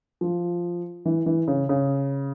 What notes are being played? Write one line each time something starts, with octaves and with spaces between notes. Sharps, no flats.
F3
E3
E3
C#3
C#3